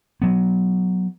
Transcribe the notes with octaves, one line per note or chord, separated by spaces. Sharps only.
F#3 B3